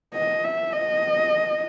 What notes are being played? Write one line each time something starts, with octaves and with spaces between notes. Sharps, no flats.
D#5
E5
D#5